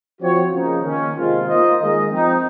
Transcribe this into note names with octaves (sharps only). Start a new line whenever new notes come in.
F3 C4 F#4 C#5
C#3 F3 A#3 D#4
D#3 A#3 C#4
C3 D#3 G#3 C4 F4
A#3 F4 C5 D#5
D#3 G#3 D#4 A#4 D#5
F3 C4 D#4